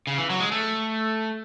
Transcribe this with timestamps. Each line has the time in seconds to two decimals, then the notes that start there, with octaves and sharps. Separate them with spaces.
0.07 C#3
0.18 E3
0.30 F#3
0.40 G#3
0.52 A3